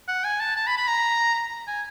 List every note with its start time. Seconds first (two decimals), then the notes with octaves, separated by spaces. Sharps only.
0.08 F#5
0.24 G#5
0.40 A5
0.56 A5
0.67 B5
0.77 B5
0.88 A#5
1.67 G#5